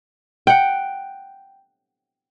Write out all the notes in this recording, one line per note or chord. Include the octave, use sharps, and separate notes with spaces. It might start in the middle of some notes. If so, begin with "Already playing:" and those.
F#5 G5